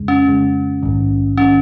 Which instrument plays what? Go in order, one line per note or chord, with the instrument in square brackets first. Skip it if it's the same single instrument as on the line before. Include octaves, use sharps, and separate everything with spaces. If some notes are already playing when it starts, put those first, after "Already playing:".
Already playing: [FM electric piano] F2 C#3 G#3
[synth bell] C#4
[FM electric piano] F2 C#3 G#3
A#1 G#2 D#3
[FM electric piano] D#3 [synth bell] C#4